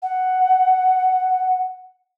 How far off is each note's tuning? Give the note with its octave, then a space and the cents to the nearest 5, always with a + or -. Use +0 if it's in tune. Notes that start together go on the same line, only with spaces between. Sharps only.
F#5 +5